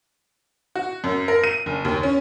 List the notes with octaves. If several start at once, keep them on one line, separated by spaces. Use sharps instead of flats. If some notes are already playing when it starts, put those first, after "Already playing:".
F#4
F#2
A#4
D#7
F#1
D#2
C#4